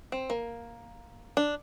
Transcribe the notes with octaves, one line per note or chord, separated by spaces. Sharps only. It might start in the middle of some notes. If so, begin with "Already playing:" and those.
C4
A#3
D4